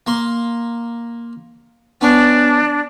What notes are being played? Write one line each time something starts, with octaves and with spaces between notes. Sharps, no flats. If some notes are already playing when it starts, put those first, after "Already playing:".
A#3 C6
B3 C#4 D4